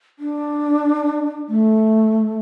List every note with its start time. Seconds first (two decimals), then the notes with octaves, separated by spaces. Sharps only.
0.19 D4
1.49 A3